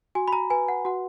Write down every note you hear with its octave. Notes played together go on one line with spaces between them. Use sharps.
F#4 G#5
B5
A#5
B4 G#5
F#5
F#4 F#5